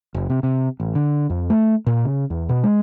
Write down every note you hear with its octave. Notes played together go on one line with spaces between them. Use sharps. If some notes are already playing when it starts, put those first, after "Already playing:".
F#1
C3
C3
A1
D3
F2
A3
A#2
C#3
E2
B2
G#3